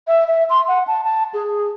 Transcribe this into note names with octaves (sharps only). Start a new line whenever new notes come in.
E5
E5
C6
F#5
A5
A5
G#4